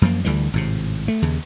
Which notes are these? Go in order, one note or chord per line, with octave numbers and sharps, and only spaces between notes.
F#2 F3 A#3
D2 D3 E3 G3
G#1 A2 C3
A3
D#2 C#3